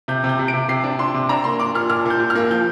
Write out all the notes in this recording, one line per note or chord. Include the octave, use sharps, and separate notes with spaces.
C3 G6
C3
G6
C3
D7
C3
C3 C7
D4
D4 C6
C3
D4 A#5
A#3 C6
D4 D6
A#2 F6
A#2 F6
A#2 G6
A#2
F6
A#3
F3 G6